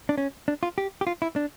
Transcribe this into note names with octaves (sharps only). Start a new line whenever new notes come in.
D4
C#4
D4
F4
G4
G4
F4
E4
D4